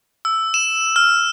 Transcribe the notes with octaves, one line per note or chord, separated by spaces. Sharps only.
E6
E7
F6